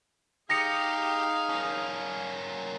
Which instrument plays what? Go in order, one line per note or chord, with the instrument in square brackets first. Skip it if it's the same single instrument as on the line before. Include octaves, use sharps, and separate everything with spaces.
[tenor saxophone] D#4 [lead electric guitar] G4 [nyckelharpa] G#4 F5 [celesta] A#6 C#7
[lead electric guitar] A#3 C#4